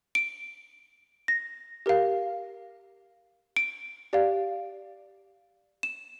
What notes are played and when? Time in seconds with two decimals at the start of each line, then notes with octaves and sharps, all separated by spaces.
0.15 D7
1.28 A#6
1.86 G4 A#4 F5
3.57 D7
4.13 G4 D5 F5
5.83 E7